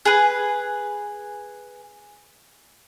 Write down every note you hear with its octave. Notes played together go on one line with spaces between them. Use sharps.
G#4 B4